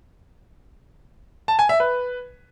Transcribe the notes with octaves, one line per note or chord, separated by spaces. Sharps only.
A5
G#5
E5
B4